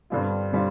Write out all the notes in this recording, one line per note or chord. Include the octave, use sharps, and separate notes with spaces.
G2 D3 G3 C4 F4
D3 G3 C4 F4